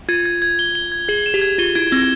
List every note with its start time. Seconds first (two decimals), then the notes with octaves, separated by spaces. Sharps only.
0.09 F4 G#6
0.26 G#6
0.42 G#6
0.59 G7
0.75 G7
0.92 G#6
1.08 G#4 G#6
1.26 E7
1.34 G4
1.41 G#6
1.58 F4 G7
1.75 E4 G#6
1.92 C4 G#6